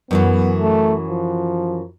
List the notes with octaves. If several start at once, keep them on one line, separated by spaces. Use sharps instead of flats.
F#2 E3 F#3 B3
A3
F3